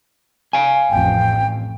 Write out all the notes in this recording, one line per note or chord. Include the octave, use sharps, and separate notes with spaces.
F5 G#5
A1 F2 G5